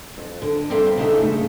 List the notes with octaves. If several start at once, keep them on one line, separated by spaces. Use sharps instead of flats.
F2
D3
G3 A#3 C4 A4 C5 E5
C#3 G#3 D4 D#4 A4 E5
C#3 A3 E5